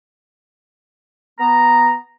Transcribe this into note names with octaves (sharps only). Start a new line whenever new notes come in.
B3 A#5